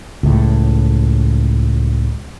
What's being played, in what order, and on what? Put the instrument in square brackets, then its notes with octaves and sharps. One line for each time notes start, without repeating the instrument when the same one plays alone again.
[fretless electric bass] C#2 A2